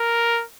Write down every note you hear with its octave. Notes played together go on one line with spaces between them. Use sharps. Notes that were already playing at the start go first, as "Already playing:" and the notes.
Already playing: A#4